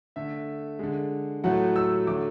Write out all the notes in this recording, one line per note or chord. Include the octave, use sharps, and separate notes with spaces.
D3 A3 E5
D3 G#3
A2 F#3 A3 F#5
E6
D3 F#3 A3 D6